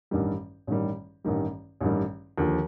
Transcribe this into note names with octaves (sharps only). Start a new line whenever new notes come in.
A1 G2 D#3 G3
A1 G2 D#3 G3
A1 G2 D#3 G3
A1 G2 D#3 G3
D#2 D3 F3